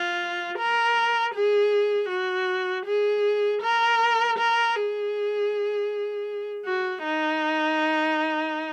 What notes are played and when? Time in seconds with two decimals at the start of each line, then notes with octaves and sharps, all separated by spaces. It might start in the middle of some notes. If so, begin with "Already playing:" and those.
Already playing: F4
0.58 A#4
1.34 G#4
2.09 F#4
2.86 G#4
3.63 A#4
4.39 A#4
4.76 G#4
6.66 F#4
7.04 D#4